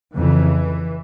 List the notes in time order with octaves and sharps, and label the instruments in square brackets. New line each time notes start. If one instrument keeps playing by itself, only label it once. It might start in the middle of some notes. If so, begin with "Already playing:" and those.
[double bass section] F2 C#3 E3